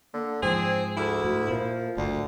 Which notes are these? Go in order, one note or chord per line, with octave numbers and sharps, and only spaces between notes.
D3 A#3
G#2 F3 C4 G#4 C5
D2 E4 G#4
A2 F#4
A#2 F3 A#4
F#1 D2 A2 D5